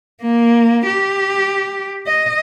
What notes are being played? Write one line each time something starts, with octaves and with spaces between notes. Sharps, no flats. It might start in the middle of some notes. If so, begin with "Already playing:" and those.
A#3
G4
D#5